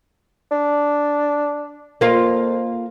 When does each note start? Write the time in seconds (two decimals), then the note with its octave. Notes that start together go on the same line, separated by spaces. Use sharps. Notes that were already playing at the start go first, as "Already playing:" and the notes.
0.52 D4
2.01 F2 A#3 F4